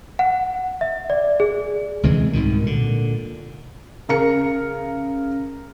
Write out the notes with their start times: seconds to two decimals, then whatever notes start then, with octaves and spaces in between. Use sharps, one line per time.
0.19 F#5
0.81 E5
1.10 D5
1.40 G#4
2.03 D2 C3 E3 G#3
2.33 C2 G#2 B2 D#3
2.62 A#2 D3
4.09 C#3 A#4 A#5 C#7